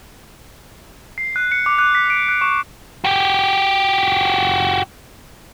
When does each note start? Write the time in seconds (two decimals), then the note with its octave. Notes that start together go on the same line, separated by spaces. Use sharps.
1.18 C7
1.36 F#6
1.52 C#7
1.66 D6
1.79 F#6
1.95 B6
2.10 D7
2.29 F#6
2.41 C#6
3.04 F#4 G4